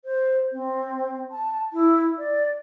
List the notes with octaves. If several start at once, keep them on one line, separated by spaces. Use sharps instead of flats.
C5
C4
A5
E4
D5